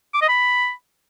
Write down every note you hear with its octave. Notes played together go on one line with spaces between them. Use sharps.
D6
D#5
B5